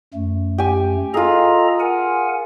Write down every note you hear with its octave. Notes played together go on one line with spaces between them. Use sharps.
F#2 A3
G4 G#5
F4 G#4 A4 D#5 A#5
A#4 F#5 G#5